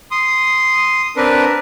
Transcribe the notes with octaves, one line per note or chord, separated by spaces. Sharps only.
C6 D#6
C4 D4 A#4 B4